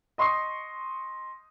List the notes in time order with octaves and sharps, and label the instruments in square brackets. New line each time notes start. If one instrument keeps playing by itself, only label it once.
[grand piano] D#5 C6 C#6 D#6 C7